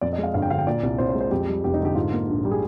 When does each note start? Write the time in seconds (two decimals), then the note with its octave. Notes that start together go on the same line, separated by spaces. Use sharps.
0.01 F2 D5
0.13 D#5
0.18 G#3
0.23 F5
0.34 G1 F5
0.42 G5
0.50 D3 F5
0.58 G5
0.67 A#2 D5
0.83 C2
0.98 C2 C5
1.09 C5
1.15 G#3
1.21 C5
1.31 F2 G4
1.47 G3
1.64 F1 G4
1.74 D#4
1.80 D3 G4
1.95 G#2 F4
2.13 A#3
2.28 A#1
2.45 G3
2.51 G#4